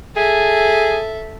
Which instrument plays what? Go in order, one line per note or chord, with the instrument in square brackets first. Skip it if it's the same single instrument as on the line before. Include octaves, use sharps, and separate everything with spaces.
[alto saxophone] G#4 [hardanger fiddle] A4 E5